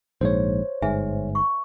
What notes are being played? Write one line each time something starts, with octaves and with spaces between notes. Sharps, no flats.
A#1 G#2 C5 C#5
G1 G#2 B4 E5 G#5
C#6